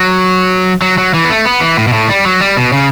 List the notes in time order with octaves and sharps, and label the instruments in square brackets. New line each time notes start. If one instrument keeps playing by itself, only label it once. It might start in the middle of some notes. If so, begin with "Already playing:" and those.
Already playing: [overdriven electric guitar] F#3
F#3
F#3
E3
B3
A3
B3
E3
A2
B2
A2
G3
F#3
G3
B2
C#3